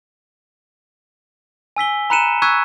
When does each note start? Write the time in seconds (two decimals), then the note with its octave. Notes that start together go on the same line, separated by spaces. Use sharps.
1.77 G#5 E6 B6 G7
2.10 A#5 B5 F#6 C#7 D#7 E7
2.42 C#6 E6 F#6 G#6 B6 D#7